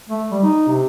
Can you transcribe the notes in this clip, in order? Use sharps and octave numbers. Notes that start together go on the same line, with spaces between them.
A3
G3
D#4
C3